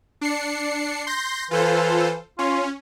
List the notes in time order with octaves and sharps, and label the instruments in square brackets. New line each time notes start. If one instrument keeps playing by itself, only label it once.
[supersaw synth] D4 C7 C#7
C6 G6 A#6
[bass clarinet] E3 [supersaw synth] F4 A4 C5
[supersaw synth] C#4 [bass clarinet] F4